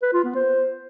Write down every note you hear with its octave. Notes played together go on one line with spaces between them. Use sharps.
B4
F4
B3
C5